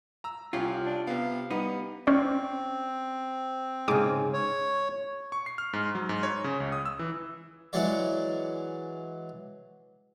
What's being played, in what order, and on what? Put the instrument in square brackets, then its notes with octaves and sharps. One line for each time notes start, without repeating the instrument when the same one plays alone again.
[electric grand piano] A#5 E6
[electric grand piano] C2 G4 C7 [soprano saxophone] C#4 [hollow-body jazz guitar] F4
[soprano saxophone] D4
[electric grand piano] C3 B3 [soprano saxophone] F5
[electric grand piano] G3 [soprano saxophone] B3 [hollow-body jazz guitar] D#4
[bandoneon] C4 [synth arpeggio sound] C#4 C5 D5
[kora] G#2 C#3 [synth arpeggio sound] D6 D#6
[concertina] C#5
[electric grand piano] C#6
C7
F6
G#2
F#3
G#2
C#5
C#3
C#2
D#6
E6
E3
[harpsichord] E3 F#3 G#3 C#5 D5